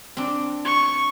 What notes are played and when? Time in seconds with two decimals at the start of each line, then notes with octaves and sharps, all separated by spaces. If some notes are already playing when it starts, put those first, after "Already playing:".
0.17 C4 D4
0.65 C#6